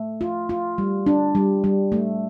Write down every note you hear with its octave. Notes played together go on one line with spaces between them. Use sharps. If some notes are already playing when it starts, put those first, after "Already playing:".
Already playing: A3
F4
F4
G3
D4
G3
G3
A3